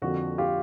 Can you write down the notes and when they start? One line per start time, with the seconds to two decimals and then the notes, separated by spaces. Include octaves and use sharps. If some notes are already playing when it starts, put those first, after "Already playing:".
0.02 F2 D3 F3 A#3 F#4
0.38 F4 G4